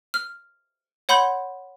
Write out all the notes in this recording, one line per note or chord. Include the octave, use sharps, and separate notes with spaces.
F6
C#5 F#5 B5 C6 G6